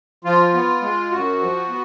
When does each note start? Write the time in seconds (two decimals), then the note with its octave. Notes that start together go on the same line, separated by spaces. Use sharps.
0.24 F3 F4
0.53 B3
0.82 G#3
1.12 F#2 F#4
1.40 F3
1.69 B3